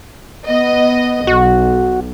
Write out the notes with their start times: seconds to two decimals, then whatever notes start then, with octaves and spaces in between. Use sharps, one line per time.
0.47 B3 D#5
1.27 B1 F#4